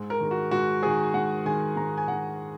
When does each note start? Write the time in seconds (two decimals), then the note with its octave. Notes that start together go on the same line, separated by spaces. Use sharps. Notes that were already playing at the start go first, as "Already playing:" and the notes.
Already playing: G#2
0.10 A#4
0.20 D#3 G#3
0.31 F#4
0.51 G#2 F#4
0.83 D#3 G#3 G#4
1.14 G#2 F#5
1.45 D#3 G#3 G#5
1.76 G#2 A#5
1.97 G#5
2.08 D#3 G#3 F#5